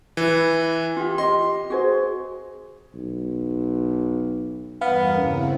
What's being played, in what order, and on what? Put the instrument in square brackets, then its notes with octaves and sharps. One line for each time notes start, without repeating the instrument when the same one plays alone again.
[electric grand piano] E3
[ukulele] F4 G4
[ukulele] G4 D#5 [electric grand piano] C6
[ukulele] F#4 G#4 C5
[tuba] B1
[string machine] E2 G2 A#4 [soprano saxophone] B3 [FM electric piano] F5
[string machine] C#3 C4 E4 [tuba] C#4